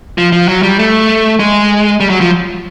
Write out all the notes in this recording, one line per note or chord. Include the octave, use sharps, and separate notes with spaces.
F3
F3
F#3
G3
A3
G#3
G3
F#3
F3